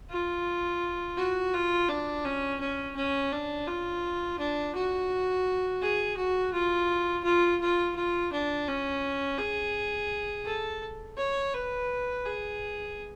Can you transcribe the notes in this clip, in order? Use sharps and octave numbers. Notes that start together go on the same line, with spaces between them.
F4
F#4
F4
D4
C#4
C#4
C#4
D4
F4
D4
F#4
G#4
F#4
F4
F4
F4
F4
D4
C#4
G#4
A4
C#5
B4
G#4